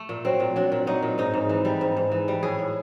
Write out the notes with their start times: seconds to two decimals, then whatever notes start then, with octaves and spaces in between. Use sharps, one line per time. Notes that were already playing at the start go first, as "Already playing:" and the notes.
Already playing: A3
0.09 A#2
0.25 F#3 C4
0.40 A#2
0.56 F#3 D4
0.72 A#2
0.87 F#3 D#4
1.03 A#2
1.18 G#2 D#4
1.34 G#2
1.49 E3
1.65 G3
1.81 G#2
1.97 G#2
2.12 E3
2.28 G3
2.43 A2 G#4
2.59 A2